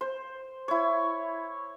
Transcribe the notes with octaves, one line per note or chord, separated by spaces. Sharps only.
C5
E4 C#5